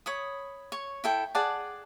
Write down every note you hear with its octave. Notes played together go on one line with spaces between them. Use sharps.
C#5 B5 D#6
C#5 C#6
E4 A4 G5
G#4 D5 F#5 A5